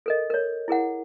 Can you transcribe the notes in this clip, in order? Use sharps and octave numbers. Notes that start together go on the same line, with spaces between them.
A4 A#4 D#5
A#4 C#5
E4 G#4 A#4 F#5